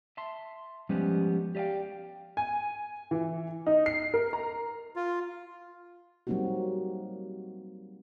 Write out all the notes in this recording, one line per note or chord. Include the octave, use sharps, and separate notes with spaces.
E5 A5 C6
F3 G3 G#3 B3 C#4 G4
G4 D5 D#5 F5 G5
G#5
E3
D#4
C7
A#4
A#5
F4
F#3 G3 A#3 C4 D#4 F#4